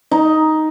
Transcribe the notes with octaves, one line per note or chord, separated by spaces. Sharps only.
D#4